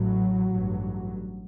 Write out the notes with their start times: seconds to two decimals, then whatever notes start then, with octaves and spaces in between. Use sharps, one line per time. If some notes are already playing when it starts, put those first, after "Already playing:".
Already playing: A1 A2 F#3
0.50 A1 G2